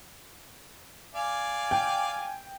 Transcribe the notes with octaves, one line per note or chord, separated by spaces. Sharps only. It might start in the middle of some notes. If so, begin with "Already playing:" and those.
D5 F5 G#5
G5